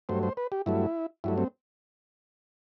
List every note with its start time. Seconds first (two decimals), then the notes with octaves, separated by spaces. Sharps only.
0.09 G2 F#3 A3 C5
0.23 C5
0.37 B4
0.52 G4
0.66 G2 F#3 A3 E4
1.24 G2 F#3 A3 E4
1.38 C4